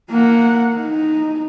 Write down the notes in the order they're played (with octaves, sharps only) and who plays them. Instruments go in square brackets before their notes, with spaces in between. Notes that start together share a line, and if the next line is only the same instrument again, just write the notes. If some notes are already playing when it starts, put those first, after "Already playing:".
[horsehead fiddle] A#3 F#5
D#4